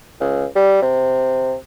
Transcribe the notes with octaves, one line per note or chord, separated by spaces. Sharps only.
C#2
G3
C3